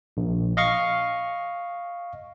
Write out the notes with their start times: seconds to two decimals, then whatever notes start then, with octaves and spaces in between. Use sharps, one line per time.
0.17 A#1
0.57 D#5 F5 C#6